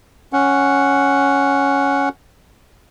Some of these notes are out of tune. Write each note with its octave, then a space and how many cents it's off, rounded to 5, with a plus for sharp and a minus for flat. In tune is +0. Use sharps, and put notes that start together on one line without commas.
C#4 +0 F#5 +0